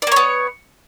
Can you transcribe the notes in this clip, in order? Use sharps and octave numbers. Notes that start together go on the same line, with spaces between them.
A#3 B3 C#5 D5